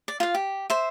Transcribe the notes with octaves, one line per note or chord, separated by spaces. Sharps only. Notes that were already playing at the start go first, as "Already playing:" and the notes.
D5
F4 F5
G4
C5 E5